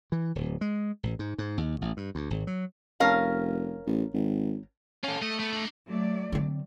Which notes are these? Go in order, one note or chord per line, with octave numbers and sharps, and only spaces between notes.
E3
D1
G#3
A1
G#2
G#2
D#2
A1
G2
D2
G#1
F#3
F1 C#4 A#4 F5
A1
G#1
C#4 F4 A4
A3 D#5
A3 B3
D4 D#4
F#3 A3 D5
D3 C4